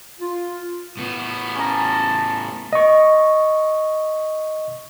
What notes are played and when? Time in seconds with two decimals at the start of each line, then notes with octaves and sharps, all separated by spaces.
0.20 F4
0.97 A2 B3
1.55 C#4 A5 A#5
2.73 D#5 C#6